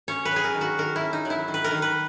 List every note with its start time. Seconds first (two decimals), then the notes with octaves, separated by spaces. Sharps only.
0.08 C#4 C#5
0.25 B4
0.31 F#3
0.36 G#4
0.44 A#4
0.54 D#3
0.61 F#4
0.78 D#3 A#4
0.96 E4
1.01 C#4
1.13 D#4
1.25 F#3
1.30 E4
1.48 D#3
1.54 B4
1.64 A#4
1.71 D#3
1.82 B4